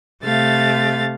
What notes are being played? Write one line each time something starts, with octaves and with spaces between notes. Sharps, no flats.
C3 A3 F5 A6